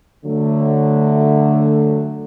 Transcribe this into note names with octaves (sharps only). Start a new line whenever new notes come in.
D3 F#3 A3